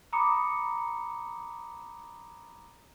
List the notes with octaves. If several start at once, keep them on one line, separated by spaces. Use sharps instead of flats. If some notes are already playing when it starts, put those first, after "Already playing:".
A#5 B5 D6 D#6 C#7